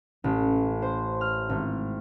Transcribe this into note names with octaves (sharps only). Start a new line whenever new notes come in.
A1
C5
F6
G#1